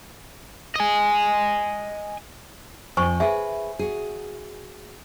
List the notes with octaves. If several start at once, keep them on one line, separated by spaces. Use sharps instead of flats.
D#5 G#5
F2 C5 G#5 C#6
G#4 B4 E5 G#5
F#4 G#4